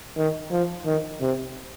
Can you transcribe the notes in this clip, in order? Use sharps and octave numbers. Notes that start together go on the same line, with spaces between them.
D#3
F3
D#3
C3